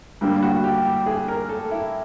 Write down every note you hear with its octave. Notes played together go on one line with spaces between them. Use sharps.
G2 D3 G3 A#3
F#4
G4
G4
G#4
A#4
A4
E4